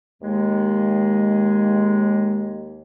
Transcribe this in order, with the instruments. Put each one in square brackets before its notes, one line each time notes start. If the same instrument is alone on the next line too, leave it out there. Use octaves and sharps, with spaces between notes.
[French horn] D#2 [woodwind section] G#3